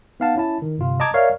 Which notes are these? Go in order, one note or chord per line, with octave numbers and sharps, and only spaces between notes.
B3 D#4 F5 F#5 A5
C#4 E4 A5
D#3
G1 C3 F4
D#5 A5 A#5 D6 G#6
A#4 C#5 D5 E5 F5